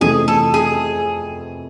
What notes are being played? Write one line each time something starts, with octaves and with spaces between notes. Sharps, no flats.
F2 C3 E3 A3 G#4
A4
G#4